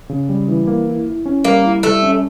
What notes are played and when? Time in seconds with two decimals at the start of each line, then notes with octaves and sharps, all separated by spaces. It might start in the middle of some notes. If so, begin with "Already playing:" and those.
0.09 C#3
0.29 G3
0.48 E3
0.67 A#3
0.86 E4
1.07 E4
1.26 C#4
1.44 G3 A#3
1.64 E4
1.83 G3 A3
2.03 C#4